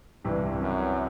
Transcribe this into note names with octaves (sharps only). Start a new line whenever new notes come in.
C2 G2 C3 E3
F#2